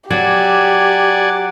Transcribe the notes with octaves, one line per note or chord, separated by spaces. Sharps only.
F#3 G4 D5 F#5 G#5